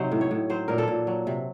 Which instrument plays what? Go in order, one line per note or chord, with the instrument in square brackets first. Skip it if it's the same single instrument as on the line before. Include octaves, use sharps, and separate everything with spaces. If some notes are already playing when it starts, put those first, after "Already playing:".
Already playing: [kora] C3 F#3 D#4 C5
A2
C#5
A2
F#3 C5
A#2 A#4
A4
A#2
F#3
C3